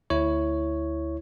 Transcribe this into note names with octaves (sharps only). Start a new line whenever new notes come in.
D2 E4 C#5